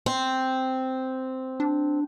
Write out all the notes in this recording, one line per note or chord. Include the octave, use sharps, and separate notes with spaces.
C4
D4